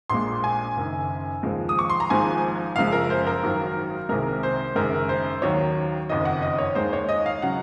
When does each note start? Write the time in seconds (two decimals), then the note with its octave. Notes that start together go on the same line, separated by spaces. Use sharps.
0.10 A#1 A#2 G#3 C6
0.44 G#5
0.76 F#1 F#2 D#3
1.43 D#2 C#3 F3 G#3
1.69 D#6
1.79 C#6
1.90 C6
2.00 A#5
2.10 G#1 G#2 F3 G#3 G#5
2.76 F#1 F#2 F3 G#3 F5
2.92 A#4
3.10 C5
3.27 A#4
3.43 G#1 G#2 D#3 F#3
4.09 C2 C3 D#3 G#3 A#4
4.43 C5
4.75 F#1 F#2 D#3 G#3 A#4
5.09 C5
5.42 D#2 D#3 F#3 C#5
6.09 F#1 F2 D#3 D#5
6.25 F#5
6.42 D#5
6.58 C#5
6.75 D#2 D#3 G#3 C5
6.93 C#5
7.09 D#5
7.26 F5
7.42 C#3 F#3 F#5